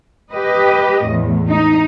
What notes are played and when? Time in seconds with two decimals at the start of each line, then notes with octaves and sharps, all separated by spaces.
0.31 G4 B4 D#5
1.04 E2 A2
1.48 D#4